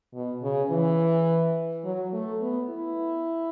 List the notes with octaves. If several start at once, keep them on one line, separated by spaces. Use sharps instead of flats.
B2
C#3
E3
F#3
A3
B3
E4